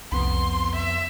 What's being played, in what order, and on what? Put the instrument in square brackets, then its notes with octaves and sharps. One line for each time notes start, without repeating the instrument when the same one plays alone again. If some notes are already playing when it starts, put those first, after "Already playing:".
[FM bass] C2 [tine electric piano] F2 B3 [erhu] C6
[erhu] E5